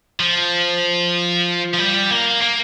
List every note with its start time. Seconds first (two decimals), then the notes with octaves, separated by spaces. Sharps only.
0.20 F3
1.73 F3
1.78 G3
2.10 A#3
2.41 A#3